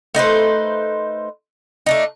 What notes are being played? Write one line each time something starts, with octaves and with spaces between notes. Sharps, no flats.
A3 D#4 B4 C5
A3 D4 D#4